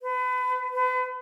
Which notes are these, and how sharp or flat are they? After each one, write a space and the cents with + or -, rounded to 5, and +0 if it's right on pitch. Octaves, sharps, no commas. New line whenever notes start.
B4 +35
B4 +40